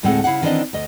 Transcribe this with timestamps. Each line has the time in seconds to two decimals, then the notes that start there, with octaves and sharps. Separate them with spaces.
0.03 D2 A2 G#3 C4 A4 F#5
0.24 C#3 E4 F5 F#5
0.42 D#3 E3 B3 C4 D4 D#5
0.73 D2 D#5